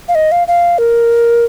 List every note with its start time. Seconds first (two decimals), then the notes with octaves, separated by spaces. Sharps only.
0.08 F5
0.15 D#5
0.32 F5
0.48 F5
0.78 A#4